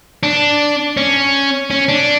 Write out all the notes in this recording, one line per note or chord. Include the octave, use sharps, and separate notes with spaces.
D4
C#4
C#4
D4